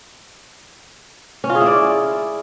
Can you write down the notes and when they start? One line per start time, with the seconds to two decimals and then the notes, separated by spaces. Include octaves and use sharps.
1.44 C#4
1.49 F4
1.55 G#4
1.61 E4
1.66 D5